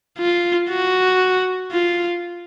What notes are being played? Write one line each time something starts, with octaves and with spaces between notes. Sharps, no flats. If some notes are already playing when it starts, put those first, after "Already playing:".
F4
F#4
F4